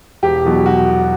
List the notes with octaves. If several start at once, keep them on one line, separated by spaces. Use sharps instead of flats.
E1 G4
E2 B2 F#3
F#4